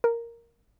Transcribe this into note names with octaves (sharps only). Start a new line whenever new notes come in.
A#4